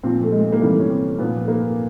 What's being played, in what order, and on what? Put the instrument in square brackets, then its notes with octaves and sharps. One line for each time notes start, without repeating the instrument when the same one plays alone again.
[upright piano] A#2 F3 C4
A3
G#3
A#3
C3 E3 G3 A3
C#4
C4
A#2 F3 B3
A3
A#3